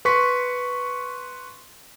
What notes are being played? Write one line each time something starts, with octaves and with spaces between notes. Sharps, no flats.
B4 C6 C#6 B6